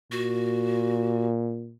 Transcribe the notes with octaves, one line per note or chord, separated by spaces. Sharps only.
A#2 F#4